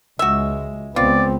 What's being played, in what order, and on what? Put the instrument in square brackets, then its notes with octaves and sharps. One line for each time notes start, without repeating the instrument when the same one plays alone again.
[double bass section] C#2 G#3 [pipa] F#4 E5
[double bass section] C#2 B3 [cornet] C4 [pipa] F4 [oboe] D5